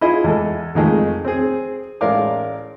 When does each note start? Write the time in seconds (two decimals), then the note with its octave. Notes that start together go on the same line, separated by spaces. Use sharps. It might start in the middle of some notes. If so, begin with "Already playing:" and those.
0.01 E4 F4 G#4 D#5
0.24 E2 G#3 A4
0.75 F2 D#3 G#3 A3
1.25 C4 G#4
2.01 A1 G#3 A#4 D5 F5 D6